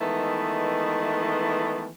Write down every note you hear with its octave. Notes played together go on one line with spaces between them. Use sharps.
D#3 E3 G#3 A3 B3